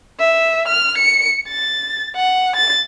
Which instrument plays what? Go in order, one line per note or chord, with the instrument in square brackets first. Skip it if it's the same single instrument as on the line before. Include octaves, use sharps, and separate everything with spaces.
[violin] E5
F6
C#7
A6
F#5
A6